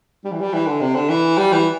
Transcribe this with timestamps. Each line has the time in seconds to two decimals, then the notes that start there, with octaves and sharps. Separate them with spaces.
0.25 G3
0.32 E3
0.40 G3
0.53 E3
0.67 D3
0.81 C3
0.95 D3
1.09 E3
1.38 G3
1.52 E3